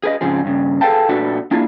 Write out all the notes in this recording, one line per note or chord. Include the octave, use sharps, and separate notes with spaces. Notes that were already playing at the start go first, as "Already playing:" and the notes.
G#4 B4 D#5
G#2 C#3 F3 C4 G#4
G2 C#3
G#4 A4 B4 F5 G5 A5
A#2 A3 D4 F#4 A4 B4
A#3 D4 E4 F4 G#4